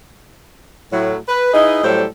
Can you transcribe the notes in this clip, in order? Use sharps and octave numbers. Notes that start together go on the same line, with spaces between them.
A2 F#3
B4
D#4 E4 G#4 B4 D#5
A2 F#3 G3 G4 A4 C5